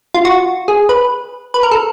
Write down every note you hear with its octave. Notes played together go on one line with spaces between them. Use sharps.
F4
F#4
G#4
B4
B4
A#4
A4